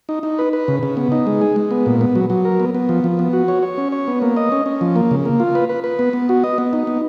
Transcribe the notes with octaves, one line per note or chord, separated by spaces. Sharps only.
D#4
D#4
B4
B4
C#3
C#3
B3
D#4
G#3
G#4
G#3
B3
A#2
B3
F#3
F#3
A#4
B3
B3
F3
F3
B3
F#4
C#5
C#5
C#4
C#5
B3
A#3
D#5
C#4
C#4
F3
A#3
C#3
A#3
F4
B4
B4
B4
B3
B3
F#4
D#5
B3
D#4
B3